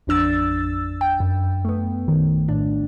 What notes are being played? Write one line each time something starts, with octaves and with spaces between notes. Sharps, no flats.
A1 F2 D4 E6 A6
G5
F#2
A3 B3
A#1 D#3
A2 D4